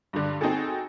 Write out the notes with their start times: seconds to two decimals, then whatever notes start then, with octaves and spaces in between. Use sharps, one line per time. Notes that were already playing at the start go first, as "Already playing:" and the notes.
0.13 G2 D3
0.41 C4 D#4 F#4 G#4 A4